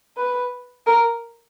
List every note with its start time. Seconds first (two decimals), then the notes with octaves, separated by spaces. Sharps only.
0.17 B4
0.87 A#4